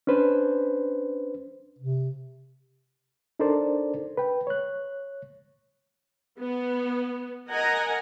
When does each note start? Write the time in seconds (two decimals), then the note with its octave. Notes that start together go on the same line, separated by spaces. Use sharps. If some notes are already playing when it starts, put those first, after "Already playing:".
0.07 C#4 D4 B4 C5
1.79 C3
3.39 D4 D#4 A4 A#4 C5 D5
4.17 B4 G5
4.47 C#5 F#6
6.39 B3
7.49 A#4 D#5 F#5 G#5 A#5